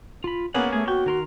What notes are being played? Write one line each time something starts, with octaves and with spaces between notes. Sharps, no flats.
F4 B5
A#3 B3 C#4 G#4 F#5
A3 G#4
F#4 G5 C#6
D#3 A#4 C6